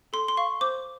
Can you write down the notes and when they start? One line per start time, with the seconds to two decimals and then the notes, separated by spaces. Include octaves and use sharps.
0.13 A4 C6
0.28 C6
0.37 F5 C#6
0.61 C5 D6